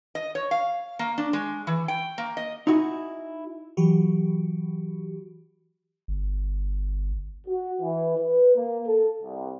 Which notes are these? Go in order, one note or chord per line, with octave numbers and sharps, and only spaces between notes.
D#5
C#5
F5
A#3
D4
G#3
E3
G5
A#3
D#5
D#4 E4 F#4 G#4
E3 F#3 F#4 G4
G1
F#4
E3
B4
A#3
A4
C2